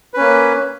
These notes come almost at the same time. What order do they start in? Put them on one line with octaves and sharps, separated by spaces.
B4 C#4 A#3